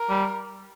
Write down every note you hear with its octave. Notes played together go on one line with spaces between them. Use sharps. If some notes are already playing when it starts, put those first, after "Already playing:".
Already playing: A#4
G3